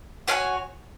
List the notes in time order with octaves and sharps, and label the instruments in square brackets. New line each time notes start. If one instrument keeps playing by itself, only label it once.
[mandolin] F#4 C#5 F5 G#5